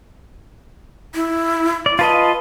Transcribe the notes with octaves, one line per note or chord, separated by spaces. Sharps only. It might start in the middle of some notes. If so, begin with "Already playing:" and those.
E4
D5
F4 B4 D#5 A5